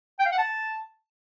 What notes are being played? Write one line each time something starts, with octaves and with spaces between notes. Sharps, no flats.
G5
F5
F#5
A5